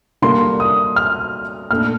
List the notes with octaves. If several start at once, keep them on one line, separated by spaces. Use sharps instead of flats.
D3 G3 A#3 D4 C6
D#6
F6
A#2 A3 D4 F6